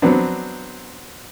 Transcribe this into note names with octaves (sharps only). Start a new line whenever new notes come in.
F#3 B3 C4 D4